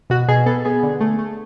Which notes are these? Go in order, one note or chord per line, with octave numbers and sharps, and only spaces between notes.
B2 F#4
B2 G#4
B3 A4
B3 G#4
D3
A3
A3